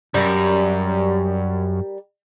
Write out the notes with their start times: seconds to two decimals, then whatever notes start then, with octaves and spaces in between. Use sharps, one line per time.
0.14 F#2 G3 A#4